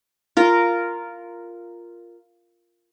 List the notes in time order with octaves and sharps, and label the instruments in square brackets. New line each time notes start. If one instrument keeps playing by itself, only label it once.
[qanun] F4 A#4